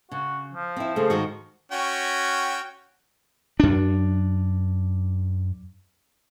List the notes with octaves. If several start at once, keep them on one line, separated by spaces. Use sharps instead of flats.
C#3 F#4
F3
C4 E4
C#3 A3 G#4 A4 C5
G#2 D#3 F#4
C#4 F#4 G5
F#2 D4